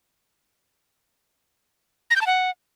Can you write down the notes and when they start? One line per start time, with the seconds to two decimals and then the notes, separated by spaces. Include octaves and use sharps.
2.11 A#6
2.16 G6
2.21 A5
2.27 F#5